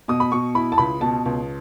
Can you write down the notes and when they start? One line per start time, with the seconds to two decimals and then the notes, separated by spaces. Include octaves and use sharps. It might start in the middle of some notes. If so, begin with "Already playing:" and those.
0.08 B2 D#6
0.20 B5
0.32 B2 C#6
0.55 E4 B5
0.72 A5
0.78 C#2 B5
1.01 B2 A5
1.25 C#2